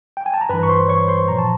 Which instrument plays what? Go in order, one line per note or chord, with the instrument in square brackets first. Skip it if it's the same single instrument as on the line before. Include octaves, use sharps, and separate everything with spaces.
[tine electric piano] G5
G#5
A5
A#5
G2 E3 B4 B5
C#6
C5 C6
C#5 C#6
C5 C6
A#2 F3 A#5
A5